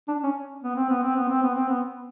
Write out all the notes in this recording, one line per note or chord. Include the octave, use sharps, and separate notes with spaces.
D4
C#4
B3
C4
B3
C4
B3
C4
B3
C4
B3